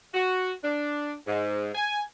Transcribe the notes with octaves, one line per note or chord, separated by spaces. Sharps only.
F#4
D4
G#2
G#5